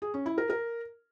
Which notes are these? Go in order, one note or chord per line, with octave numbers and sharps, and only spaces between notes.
G#4
C#4
E4
A#4
A#4